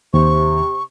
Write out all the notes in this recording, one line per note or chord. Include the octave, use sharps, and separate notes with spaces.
D#2 C3 C#6